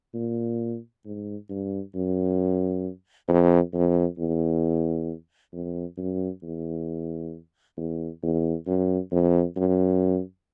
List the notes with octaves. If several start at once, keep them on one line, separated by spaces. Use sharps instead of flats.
A#2
G#2
G2
F#2
F2
F2
E2
F2
F#2
E2
E2
E2
F#2
F2
F#2